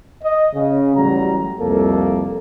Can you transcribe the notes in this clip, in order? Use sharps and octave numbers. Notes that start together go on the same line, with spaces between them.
D#5
C#3
A1 F#3 G3 A#5
C2 F2 A#3 A4